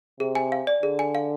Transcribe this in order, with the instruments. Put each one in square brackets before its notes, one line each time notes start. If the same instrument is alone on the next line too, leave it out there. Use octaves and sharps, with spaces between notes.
[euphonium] C3 [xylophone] G#4
[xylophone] G#5
F5
D5
[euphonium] D3 [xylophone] G#4
[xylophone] G#5
F5